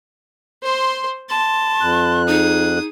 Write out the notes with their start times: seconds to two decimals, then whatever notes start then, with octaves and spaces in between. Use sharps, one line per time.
0.63 C5 C6
1.29 A5 C6
1.81 F2 F#6
2.28 D#4 G#4 D#6